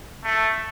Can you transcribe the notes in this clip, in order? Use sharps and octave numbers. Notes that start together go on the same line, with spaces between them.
A3